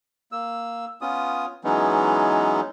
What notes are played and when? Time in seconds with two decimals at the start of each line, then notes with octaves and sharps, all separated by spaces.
0.32 A#3 E6
1.01 B3 C#4 F4 D#6
1.64 E3 F#3 G#3 B3 C#4 D#4